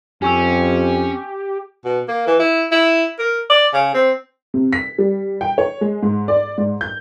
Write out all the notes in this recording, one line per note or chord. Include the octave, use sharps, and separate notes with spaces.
F2 C#4 G4 G#5 C#6 E6
B2
A#3
E3
E4
E4
A#4
D5
C#3
C4
C3
B6
G3
G5
C#5
G#3
G#2
D5
G#2
G6